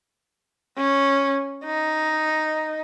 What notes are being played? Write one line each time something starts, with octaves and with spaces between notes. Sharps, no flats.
C#4
D#4